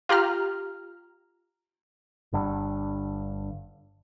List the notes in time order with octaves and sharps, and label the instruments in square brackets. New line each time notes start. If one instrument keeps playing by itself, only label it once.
[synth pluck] F4 G4 A#5 F6
[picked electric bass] G1 G2 D3